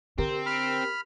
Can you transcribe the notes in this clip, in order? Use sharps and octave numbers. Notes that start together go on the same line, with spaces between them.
D3 C4 G4 A#4
B5 F6